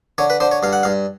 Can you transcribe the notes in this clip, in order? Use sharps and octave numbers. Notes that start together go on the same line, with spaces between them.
D3 C#5
B4
D3 C5
C#5
G2 F5
F#5
G2 F5